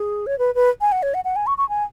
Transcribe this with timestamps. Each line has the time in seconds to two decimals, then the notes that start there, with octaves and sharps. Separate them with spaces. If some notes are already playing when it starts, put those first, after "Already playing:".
Already playing: G#4
0.27 C#5
0.39 B4
0.55 B4
0.81 G#5
0.92 F#5
1.03 C#5
1.14 F#5
1.25 F#5
1.36 G#5
1.47 C#6
1.58 C#6
1.69 G#5